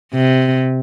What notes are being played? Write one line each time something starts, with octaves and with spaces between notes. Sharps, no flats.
C3